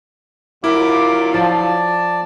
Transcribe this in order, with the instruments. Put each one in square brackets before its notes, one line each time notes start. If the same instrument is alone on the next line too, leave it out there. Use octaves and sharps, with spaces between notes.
[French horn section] D2 F#3 F4 [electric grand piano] E4 [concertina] G4 A#4 D6
[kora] F3 [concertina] D5 A5